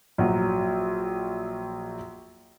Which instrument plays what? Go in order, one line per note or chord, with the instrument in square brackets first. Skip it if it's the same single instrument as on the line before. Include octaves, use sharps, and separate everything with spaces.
[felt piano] A#1 F#3